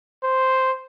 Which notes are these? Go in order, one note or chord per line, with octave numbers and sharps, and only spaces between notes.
C5